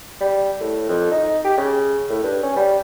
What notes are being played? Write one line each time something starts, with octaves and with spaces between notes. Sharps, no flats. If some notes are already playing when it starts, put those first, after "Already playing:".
G3
A2
F2
D#4
G4
C#3
A2
G2
C#4
G3